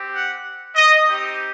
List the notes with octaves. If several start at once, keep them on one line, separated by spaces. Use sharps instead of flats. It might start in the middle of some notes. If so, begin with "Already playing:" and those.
Already playing: C4 G4
F#5
D#5
C4 D#4 G4